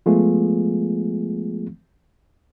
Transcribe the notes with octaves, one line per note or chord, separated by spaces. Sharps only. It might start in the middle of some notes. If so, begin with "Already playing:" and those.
F3 G#3 A3 B3 F4 G#4